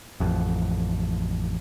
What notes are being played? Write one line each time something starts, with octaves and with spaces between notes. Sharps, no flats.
A1 F2